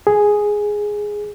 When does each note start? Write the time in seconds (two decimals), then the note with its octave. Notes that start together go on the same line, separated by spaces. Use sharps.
0.07 G#4